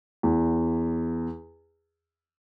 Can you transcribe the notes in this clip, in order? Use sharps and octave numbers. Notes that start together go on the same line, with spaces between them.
E2